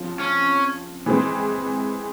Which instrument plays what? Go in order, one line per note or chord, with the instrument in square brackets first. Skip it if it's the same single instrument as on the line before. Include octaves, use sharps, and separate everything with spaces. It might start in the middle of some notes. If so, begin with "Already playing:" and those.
Already playing: [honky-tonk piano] C#3 F3 C4 F4
[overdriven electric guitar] C#4
[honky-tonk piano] E3 G#3 C4